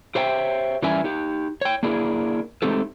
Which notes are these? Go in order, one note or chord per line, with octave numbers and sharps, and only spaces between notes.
G4 C5 C#5 E5 G5
E3 G3 C#4 A#4 E5 G#5
D#4 G4
C#5 G5
A#3 D4 E4 G#4 A#4
G#3 A3 C4 D#4 G4 A4